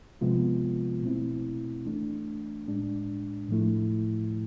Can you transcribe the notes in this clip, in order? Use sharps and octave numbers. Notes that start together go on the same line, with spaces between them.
C3 F3 G#3 B3 F4
B2 A3 C4 E4
E3 A3 D4
A2 G#3 D4
A2 F3 A3 E4